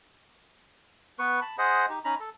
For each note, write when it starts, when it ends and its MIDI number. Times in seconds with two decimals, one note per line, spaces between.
1.19 1.40 59
1.19 1.40 71
1.19 1.40 85
1.42 1.56 81
1.42 1.56 83
1.58 1.86 68
1.58 1.86 72
1.58 1.86 75
1.58 1.86 78
1.89 1.99 63
1.89 1.99 67
2.04 2.15 61
2.04 2.15 63
2.04 2.15 82
2.04 2.15 83
2.20 2.30 69